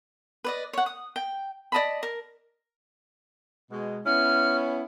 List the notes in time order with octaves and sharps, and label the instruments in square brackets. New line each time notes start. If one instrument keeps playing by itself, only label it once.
[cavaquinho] B4 D5 D#5
C#5 F#5
D#6
G5
D5 D#5 A5 B5
A#4
[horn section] B2 G#3
[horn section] B3 C#4 E4 [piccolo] F6